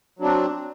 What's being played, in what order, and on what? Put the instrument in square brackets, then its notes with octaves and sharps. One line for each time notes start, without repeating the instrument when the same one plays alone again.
[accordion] F#3
D4
C4